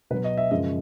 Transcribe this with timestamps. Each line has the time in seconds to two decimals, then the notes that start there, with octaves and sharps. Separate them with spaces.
0.10 B2 B4
0.14 F#3
0.24 D#5
0.38 E5
0.51 F#2 C#3 F3 G#3 D#5